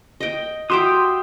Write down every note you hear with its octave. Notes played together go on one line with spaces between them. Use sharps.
D#5 G5
F#4 G4 E5 G5 C6 D#6